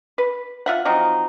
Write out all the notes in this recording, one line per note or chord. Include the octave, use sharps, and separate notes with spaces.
B4
F4 E5 F#5
F3 F#3 C4 D#4